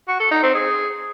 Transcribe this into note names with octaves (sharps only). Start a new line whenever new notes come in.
F#4
A4
D#4
C4
G#4